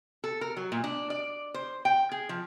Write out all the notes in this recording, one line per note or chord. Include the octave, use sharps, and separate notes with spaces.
A4
A#4
F#3
A#2
D4
D5
C5
G5
G#4
F3